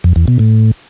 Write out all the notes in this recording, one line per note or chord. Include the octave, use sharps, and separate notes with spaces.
F2
E2
B2
A2